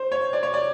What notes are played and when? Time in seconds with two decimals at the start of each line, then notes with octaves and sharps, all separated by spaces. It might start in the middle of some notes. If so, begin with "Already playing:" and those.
Already playing: C5
0.12 C#5
0.33 D5
0.43 C#5
0.54 D5